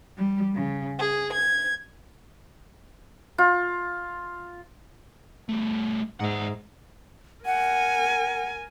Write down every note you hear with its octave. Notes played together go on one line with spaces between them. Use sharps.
G3
C#3
G#4
G#6
F4
G3 A3
G#2 E5 F#5
A#4 F#5 G#5